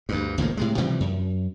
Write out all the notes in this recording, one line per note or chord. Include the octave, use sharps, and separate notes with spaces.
D2 G2
G#1 C#2 A2 A#3
A2 C3 G#3
C3 E3 F3 G3
F#2